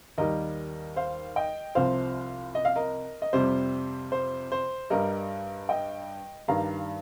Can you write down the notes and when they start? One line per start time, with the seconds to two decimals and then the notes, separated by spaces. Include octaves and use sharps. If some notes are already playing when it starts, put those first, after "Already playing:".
0.18 D#2 D#3 G3 A#4 D#5
0.96 C5 F5
1.36 D#5 G5
1.75 C2 C3 F3 C5 F5
2.55 D#5
2.65 F5
2.76 A#4 D#5
3.22 D#5
3.33 F2 C3 G3 C5
4.12 C5
4.52 C5
4.90 G2 G3 A#4 D#5
5.69 D#5 G5
6.48 G2 D#3 G3 F5 A#5